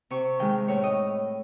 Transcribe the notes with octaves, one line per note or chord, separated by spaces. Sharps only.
C3 C#6
D#3 G#3 G5
A2 C#5
D#5